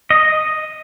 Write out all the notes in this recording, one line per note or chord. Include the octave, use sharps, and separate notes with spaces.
D#5